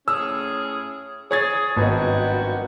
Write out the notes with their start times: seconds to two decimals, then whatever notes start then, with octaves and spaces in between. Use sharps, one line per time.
0.08 A2 C#4 G#4 E6
1.31 G#4 C#5 G#6 A6
1.77 G#1 G2 F3 B3 F#4 D#5